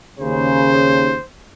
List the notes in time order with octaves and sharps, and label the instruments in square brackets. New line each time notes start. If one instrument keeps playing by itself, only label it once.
[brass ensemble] D#2 C#3 [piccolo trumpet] C5